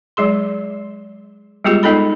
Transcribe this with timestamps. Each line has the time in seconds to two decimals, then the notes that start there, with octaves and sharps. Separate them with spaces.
0.17 F#3 G#3 G#4 C6
1.64 G3 G#3 B3 F4 G4 G#4
1.83 G#3 B3 D#4 A4 D#5 B5